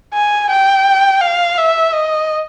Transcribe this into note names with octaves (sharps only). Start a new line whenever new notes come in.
G#5
G5
F5
E5
D#5